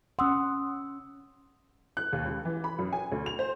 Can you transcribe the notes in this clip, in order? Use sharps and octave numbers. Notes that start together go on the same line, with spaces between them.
C#4 F#5 C6 D#6 E6
F#6
D#2
C#2
E3
B5
F#2
G#5
D2
F7
C5